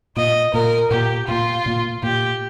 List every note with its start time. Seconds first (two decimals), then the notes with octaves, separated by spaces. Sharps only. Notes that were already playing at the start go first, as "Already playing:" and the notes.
0.16 A#2 A#3 D#5
0.53 A#2 A#3 A#4
0.91 A#2 A#3 G4
1.28 A#2 A#3 F4
1.66 A#2 A#3
2.03 A#2 A#3 G4